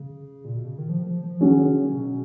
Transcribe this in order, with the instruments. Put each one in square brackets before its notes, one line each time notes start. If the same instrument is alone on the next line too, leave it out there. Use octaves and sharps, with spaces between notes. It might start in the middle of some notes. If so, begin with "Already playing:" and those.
Already playing: [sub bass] C#3
A#2
B2
C#3
D#3
F3
F3
F3
[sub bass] D#3 [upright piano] F#3 C#4 G#4
[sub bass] C#3
B2